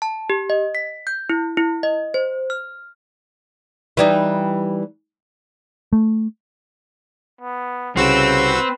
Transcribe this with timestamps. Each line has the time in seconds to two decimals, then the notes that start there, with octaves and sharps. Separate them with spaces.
0.02 A5
0.30 G4
0.50 D#5
0.75 B6
1.07 G6
1.30 E4
1.57 E4
1.83 D#5
2.14 C5
2.50 F6
3.97 E3 G3 D#4
5.93 A3
7.41 B3
7.96 C2 C#3 C4 F#4 B4 E6